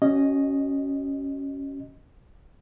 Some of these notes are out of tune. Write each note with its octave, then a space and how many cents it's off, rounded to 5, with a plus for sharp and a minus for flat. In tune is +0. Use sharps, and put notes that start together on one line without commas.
C#4 +0 F#4 +40 D#5 +0